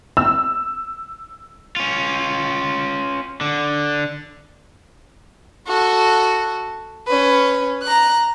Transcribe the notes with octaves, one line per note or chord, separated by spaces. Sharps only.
E6
C#4 F4
D3
F#4 A4
C#4 B4
A#5 F#6